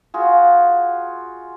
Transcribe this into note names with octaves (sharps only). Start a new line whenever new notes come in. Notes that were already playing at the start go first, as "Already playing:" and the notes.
F4 F#4 G#4